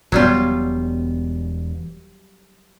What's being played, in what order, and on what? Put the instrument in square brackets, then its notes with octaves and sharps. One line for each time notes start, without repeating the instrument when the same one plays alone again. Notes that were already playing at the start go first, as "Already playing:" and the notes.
[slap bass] E1 B2 B3 [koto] F#3 G3 F4